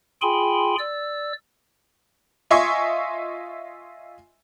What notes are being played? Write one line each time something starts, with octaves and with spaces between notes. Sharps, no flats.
F4 G#4 G5 G#5 B5 C6
D5 E6
F4 D#5 E5 G#5 C6 C#6